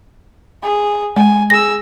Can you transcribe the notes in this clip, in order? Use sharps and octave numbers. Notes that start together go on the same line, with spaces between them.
G#4
G#3 G#5
G#4 E6 A#6